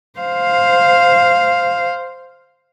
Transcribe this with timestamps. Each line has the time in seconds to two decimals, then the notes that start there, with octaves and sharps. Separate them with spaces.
0.19 C5 F5